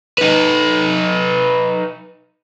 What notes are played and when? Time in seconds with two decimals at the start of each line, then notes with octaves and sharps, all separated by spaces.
0.18 D#4 B4